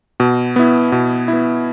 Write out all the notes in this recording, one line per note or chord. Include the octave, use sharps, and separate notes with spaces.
B2
B3 E4
B2
E4
B3